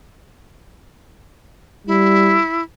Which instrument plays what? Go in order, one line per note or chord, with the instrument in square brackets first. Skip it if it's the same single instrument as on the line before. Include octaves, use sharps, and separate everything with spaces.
[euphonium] G3 [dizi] E4